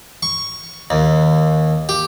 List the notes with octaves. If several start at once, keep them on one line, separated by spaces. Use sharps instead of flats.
C#6
D#2
G4